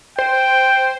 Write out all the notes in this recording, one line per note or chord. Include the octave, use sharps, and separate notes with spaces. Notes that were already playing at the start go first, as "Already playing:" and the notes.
C5 G5